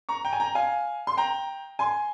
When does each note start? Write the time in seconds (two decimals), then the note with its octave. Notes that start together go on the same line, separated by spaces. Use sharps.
0.09 A#5 C#6
0.25 G5 A#5
0.33 G#5
0.40 G5 A#5
0.55 F5 G#5
1.07 C6
1.17 G5 A#5
1.79 G#5 C6